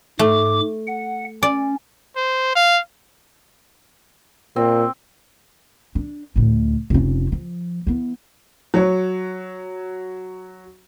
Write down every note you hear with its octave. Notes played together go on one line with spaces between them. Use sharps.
G#2 A3 D6
F#5
C#4 D5
C5
F5
A#2 C4
D4
D2 A2
F1 C#4
F3
E3 B3
F#3 C#5